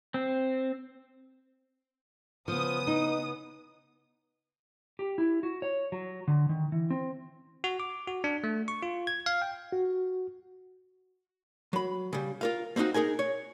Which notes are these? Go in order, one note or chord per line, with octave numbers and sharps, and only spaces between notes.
C4
C#3 F3 B3 D#6
D#4
G4
E4
F#4
C#5
F#3
D3
D#3
E3
C4
F#4
D6
F#4
D4
A3
C#6
F4
G#6
F5
G5
F#4
F#3 B5
C#3 G3
F4 A#4 F5
A#3 C4 C#4 D#4 F#4
D#4 G#4 A#4 G#5
C#5